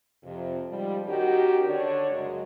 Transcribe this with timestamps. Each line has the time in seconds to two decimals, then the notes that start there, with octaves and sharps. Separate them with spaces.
0.24 F2 C3
0.70 G#2 F3 G3
1.07 D#3 C#4 D#4 F#4 G4
1.67 D3 D4 C#5 D5
2.10 F#2 C#3 G#3